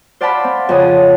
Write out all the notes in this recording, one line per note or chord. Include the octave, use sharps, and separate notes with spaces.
C5 D5 F5 F#5 A5 B5
C4
F2 C#3 D#6